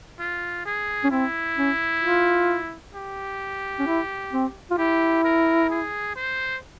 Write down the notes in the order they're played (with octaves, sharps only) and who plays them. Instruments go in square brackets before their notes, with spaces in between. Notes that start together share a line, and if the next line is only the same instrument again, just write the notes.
[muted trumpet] F4
G#4
[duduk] C#4
[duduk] C4 [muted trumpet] E4
[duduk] C#4
F4
[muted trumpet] G4
[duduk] C#4
E4
C4
F4
[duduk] E4 [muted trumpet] G4
[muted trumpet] A#4
G#4
C5